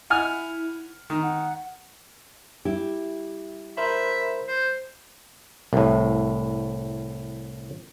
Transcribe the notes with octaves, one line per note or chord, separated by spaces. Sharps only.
E4 F#5 G#5 F6
D#3 D#4
F#5
G3 E4 G4
A#4 C5 E5 B5
C5
C2 A2